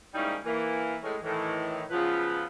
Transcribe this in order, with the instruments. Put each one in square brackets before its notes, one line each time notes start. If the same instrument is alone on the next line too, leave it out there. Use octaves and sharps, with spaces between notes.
[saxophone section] G#2 G3 A#3 C#4 D#4 E4
E3 A#3
A2 G#3 C#4
A2 D#3 E3
C#3 F3 F#3 B3 F4 B4